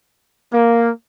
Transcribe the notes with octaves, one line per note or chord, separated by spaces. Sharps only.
A#3